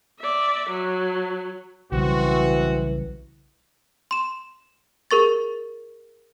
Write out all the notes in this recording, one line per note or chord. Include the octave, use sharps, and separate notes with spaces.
D5 E5
F#3
B1 C#3 E3 G3 C4 F#4
C6 E7
G#4 A#4 C#6 A6